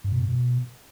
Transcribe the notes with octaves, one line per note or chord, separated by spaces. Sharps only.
G2
B2
G2
B2